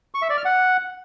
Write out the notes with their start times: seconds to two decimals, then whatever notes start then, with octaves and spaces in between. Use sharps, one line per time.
0.14 C#6
0.22 E5
0.30 D5
0.38 F6
0.45 F#5